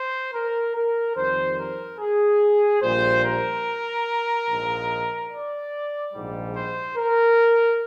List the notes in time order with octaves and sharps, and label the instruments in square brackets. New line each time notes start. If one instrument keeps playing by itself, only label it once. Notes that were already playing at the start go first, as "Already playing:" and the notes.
Already playing: [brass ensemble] C5
A#4
A#4
F2 D#3 G3 C5
A#4
G#4
A#1 A#2 G3 C5
A#4
A#1 G#2 F3 G#3
D5
A#1 G#2 G3
C5
A#4